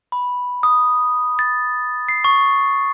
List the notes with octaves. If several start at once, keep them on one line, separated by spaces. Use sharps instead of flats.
B5
D#6
A6
C7
C#6